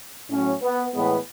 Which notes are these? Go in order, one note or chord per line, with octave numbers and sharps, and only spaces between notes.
A2 F#3 C#4
B3
A2 E3 G#3 B3